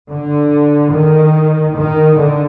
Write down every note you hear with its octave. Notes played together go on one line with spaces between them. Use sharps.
D3
D#3
D#3
D3